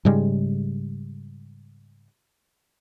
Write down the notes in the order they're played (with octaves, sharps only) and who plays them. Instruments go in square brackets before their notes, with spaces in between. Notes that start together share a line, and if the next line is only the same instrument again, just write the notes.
[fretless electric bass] G#2 C#3 G3 G#3